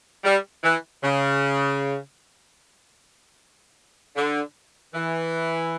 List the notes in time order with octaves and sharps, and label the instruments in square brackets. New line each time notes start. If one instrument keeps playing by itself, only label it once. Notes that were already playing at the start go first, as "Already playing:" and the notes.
[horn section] G3
E3
C#3
D3
E3